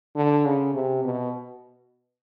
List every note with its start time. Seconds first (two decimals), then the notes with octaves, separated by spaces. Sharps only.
0.16 D3
0.45 C#3
0.74 C3
1.04 B2